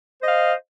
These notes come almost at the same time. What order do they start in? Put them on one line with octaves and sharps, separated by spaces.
C5 D#5 F5